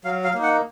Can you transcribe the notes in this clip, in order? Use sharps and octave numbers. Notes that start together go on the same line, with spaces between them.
F#3 F5
F5
A#3 D#4
F#5